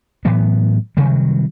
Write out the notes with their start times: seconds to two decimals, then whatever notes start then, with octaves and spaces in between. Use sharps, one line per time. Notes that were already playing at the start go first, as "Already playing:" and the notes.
0.25 A2 E3 F#3 B3
0.97 C3 D#3 F#3 G3